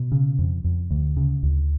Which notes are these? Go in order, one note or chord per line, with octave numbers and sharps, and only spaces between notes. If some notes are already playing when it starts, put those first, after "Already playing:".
Already playing: B2
C#3
F2
F2
D2
C#3
D2